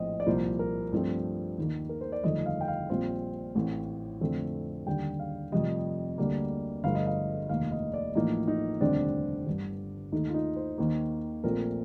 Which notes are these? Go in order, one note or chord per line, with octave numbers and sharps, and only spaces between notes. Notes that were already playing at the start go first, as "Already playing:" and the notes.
Already playing: A#1 A2 F3 C4 D#5
D5
C2 A#2 F3 A#3 C5
A#4
G2 F3 A3 C4
D#2 D#3 A#3
A#4
C5
D5
G1 F2 D#3 A3 D#5
F5
G5
F5
A#1 A#2 G3 C4
A1 A2 A3 C4
F2 D3 A3 C4
D#2 D3 G3 G5
F5
F1 F2 C3 G3 D#5
D2 D3 G3 A#3
G1 G2 F3 A3 F5
D#5
F5
F1 D#2 D#3 A#3 F5
D#5
D5
A1 A2 F3 A#3 D#4
D#4
F1 D#2 D3 G3 C4 D4
G1 G2 D3
D#2 D#3 A3 D#4
F4
D#4
C5
D#2 D#3 A#3
A#1 A#2 A3 C4 A#4